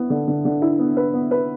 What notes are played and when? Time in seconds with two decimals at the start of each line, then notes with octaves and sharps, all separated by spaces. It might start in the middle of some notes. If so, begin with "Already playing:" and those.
Already playing: B3 E4
0.10 D3
0.28 D3
0.45 D3
0.62 E4
0.79 B3
0.97 B4
1.13 B3
1.31 B4